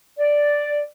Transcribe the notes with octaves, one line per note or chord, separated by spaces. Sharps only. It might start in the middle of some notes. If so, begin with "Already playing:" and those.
D5